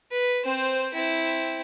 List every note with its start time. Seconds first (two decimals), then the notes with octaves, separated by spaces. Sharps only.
0.11 B4
0.44 C4 C5
0.93 C4 E4